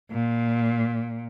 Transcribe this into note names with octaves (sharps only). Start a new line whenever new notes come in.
A#2